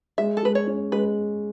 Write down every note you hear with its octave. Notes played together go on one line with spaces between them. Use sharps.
G#3 E5
A4
G#3 B4
C#5
C#4
G#3 B4